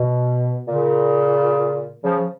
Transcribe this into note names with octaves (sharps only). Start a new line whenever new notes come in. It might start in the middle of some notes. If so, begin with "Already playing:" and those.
Already playing: B2
A#2 C#3
C#3 F3
F3